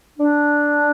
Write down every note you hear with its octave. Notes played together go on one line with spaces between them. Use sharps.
D4